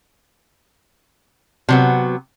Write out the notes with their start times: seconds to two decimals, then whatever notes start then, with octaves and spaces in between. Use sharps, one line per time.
1.69 C3 F#3 B3